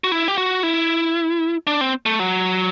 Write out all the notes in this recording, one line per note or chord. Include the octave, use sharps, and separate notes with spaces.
F#4
E4
G4
F#4
E4
D4
C4
A3
F#3